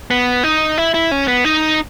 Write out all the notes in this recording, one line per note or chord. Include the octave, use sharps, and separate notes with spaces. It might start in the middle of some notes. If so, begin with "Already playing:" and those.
B3
D#4
E4
E4
C#4
B3
D#4